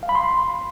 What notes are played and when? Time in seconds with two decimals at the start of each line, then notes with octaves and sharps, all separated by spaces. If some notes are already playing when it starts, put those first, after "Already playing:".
0.03 F5
0.09 B5
0.15 C6